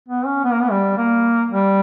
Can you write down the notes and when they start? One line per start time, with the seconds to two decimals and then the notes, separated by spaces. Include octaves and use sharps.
0.09 B3
0.25 C#4
0.44 B3
0.52 A#3
0.61 B3
0.71 G3
0.97 A#3
1.51 G3